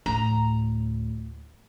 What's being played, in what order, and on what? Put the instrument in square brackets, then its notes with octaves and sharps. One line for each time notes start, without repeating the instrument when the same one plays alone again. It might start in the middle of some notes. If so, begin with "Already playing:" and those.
[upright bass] D2 A2 [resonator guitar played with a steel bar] A#5